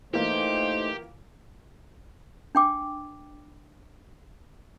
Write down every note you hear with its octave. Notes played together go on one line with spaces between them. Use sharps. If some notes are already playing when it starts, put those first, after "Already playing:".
E3 A3 A#3 D#4 F4 G4 C5
D4 G5 D6